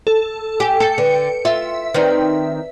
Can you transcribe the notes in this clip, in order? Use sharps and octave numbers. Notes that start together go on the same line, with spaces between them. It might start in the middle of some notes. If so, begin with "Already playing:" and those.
A4
G4 G#5
A4 G5 C#7
D3 B4
F4 E5
D#3 C4 D#4 B4 D5